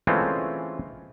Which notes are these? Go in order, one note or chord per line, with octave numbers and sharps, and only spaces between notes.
E3 G#3 A3 C4 C#4 F4